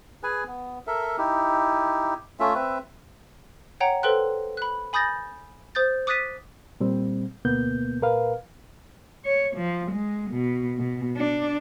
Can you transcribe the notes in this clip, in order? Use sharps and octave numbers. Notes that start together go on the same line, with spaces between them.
G#4 B4 G#5
B3
A4 A#4 E5
D#4 E4 G4
A3 C#4 F4 E5
C4 B4 E5
C#5 F#5 G5 A#5
A4 B4 C5 G5 C6 F#6
B5 F#6
G#5 B5 D#6 G6 A6 A#6
C5 D#6 G6 A6
D6 D#6 F#6 A6 B6 D#7
A#2 G3 C4
D2 B2 A#3 B3 G6
A#2 A#4 B4 F5
C#5
F3
G#3
B2
B2
D4